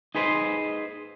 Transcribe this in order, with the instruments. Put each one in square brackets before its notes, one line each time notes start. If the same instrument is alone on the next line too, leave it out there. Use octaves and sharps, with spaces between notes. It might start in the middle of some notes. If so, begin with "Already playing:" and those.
[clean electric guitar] D#4 G#4 B4 C5